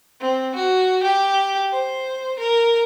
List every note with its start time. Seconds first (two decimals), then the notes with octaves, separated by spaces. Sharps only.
0.20 C4
0.55 F#4
1.03 G4
1.72 C5
2.39 A#4